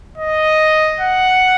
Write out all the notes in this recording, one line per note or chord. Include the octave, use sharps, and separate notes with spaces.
D#5
F#5